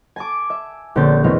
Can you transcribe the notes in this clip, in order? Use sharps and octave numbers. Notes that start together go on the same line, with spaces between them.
G#5 A5 D6
E5
A#1 D3 C4 C#4 G6 A6
E2 B2 G#3 C4 C#4 F5